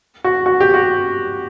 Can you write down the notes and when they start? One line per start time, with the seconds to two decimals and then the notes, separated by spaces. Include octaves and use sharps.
0.24 F#4
0.46 F#4
0.60 G4
0.74 F#4